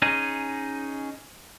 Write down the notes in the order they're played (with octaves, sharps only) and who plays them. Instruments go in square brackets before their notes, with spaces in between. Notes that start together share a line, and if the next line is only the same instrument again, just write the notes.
[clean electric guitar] C#4 D#4 G#4